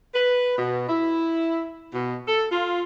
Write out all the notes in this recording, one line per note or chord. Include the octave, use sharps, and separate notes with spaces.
B4
B2
E4
B2
A4
F4